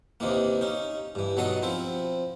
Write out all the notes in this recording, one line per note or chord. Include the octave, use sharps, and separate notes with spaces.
D#2 C3 D#3 E3 A#3
C#4 D#4
G2 E3
B2 D#3 F#3 A4 D#5 D#6
F3 C4 E4